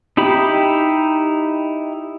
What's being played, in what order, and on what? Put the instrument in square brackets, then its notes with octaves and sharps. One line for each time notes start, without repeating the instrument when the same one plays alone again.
[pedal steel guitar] D#4 E4 G4 B5